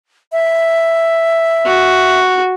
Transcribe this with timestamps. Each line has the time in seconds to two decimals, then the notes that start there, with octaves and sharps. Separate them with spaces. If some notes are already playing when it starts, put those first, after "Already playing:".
0.32 E5
1.66 F#4